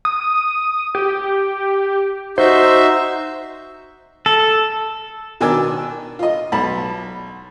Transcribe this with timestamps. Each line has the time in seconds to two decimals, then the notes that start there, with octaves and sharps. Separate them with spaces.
0.05 D#6
0.95 G4
2.38 D#4 F#4 C5 E5
4.26 A4
5.41 B2 D#3 D4 G#5 D6 E6
6.19 F4 D#5
6.52 B1 A5 B5